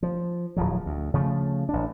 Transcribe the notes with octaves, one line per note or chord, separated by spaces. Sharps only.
F3
D1 F3 F#3
D2
C#3 F3 A3
A1 D4